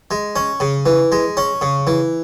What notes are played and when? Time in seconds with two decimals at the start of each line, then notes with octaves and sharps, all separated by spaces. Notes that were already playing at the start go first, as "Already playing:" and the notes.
0.11 G#3
0.36 C#4
0.60 C#3
0.86 E3
1.12 G#3
1.37 C#4
1.61 C#3
1.87 E3